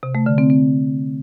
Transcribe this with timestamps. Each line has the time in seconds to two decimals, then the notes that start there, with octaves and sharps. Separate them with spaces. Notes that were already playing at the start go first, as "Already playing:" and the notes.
0.03 C3
0.15 A3
0.26 D3
0.38 C4
0.50 C4